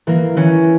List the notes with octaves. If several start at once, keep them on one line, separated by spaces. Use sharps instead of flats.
E3 A#3
E3 C#4